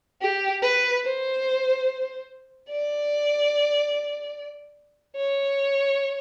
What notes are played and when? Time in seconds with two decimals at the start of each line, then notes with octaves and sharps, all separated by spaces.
0.22 G4
0.62 B4
1.04 C5
2.70 D5
5.16 C#5